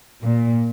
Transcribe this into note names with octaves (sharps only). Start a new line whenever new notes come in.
A#2